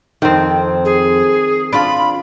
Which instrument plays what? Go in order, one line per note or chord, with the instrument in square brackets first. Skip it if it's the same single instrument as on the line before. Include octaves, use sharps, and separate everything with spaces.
[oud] F2 [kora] D#3 C4
[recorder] G#4
[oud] D4 F4 [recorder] B5